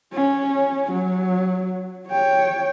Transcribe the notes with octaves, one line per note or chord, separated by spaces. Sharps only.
C#4
F#3
C#5 G5